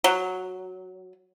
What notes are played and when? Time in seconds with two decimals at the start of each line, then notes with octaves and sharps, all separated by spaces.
0.04 F#3